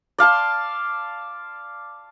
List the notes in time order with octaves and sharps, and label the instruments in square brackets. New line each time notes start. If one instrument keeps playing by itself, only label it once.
[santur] D5 F5 A5 C6